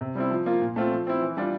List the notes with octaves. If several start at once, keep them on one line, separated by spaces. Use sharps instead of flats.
C3
G3 C4 E4
F3
A#3 F4
A#2
A3 C4 F4
F3
C4 E4
E3
G3 D4 F4